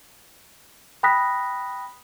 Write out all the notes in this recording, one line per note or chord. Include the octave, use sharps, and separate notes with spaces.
G5 B5 D#6 F#6 A#6 B6